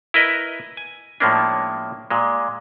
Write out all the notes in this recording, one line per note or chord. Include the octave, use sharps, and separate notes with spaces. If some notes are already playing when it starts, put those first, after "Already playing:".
E4 A#4 B4 D#5
G#5
A2 F3 G#3 A#3 C#4 D4
A#2 G#3